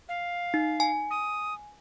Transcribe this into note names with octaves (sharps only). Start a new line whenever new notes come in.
F5
D#4
G#5
D#6